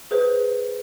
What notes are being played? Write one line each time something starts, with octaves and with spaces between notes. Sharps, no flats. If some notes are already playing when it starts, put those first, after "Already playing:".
G#4 B4 C5